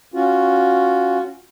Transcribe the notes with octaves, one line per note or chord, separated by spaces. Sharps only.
C#4 F4 F#4